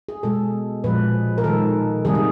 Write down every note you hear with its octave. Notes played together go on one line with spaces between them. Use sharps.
G#4
B2 G#3 A4
A#2 F3 G#3 B4
A#4
D#3 G#3 A4
C3 D#3 G3 A#3 G#4
G#4